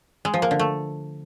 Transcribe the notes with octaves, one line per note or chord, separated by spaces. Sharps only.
G#3
F3
A#3
D3
A3